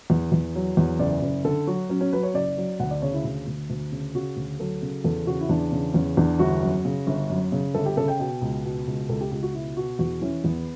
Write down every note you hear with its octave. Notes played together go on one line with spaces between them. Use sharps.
E2
E2
F#3
E2
F#1 D5
F#1
D3 A4
F#3 F#4
F#3 C#4
C#4
F#3 B4
C#5
F#1 D5
F#3
D2 F#5
D5
C#3 C#5
E4
D2
D2
D2
C#3
C#3 F#4
D2
F#3 A4
C#3
E2 A4
C#3 F#4
E4
E2 D4
C#3
E2 C#4
E2 D4
G1 F#4
F#2
C#3
G1
F#2
C#3
G1 A4
G4
C#3 A4
G5
B2 G5
C#2
B2
C#2
C#2 A4
G4
C#2 G4
F#4
B2 E4
B2 F#4
E2 F#4
E3 C#4
E2 B3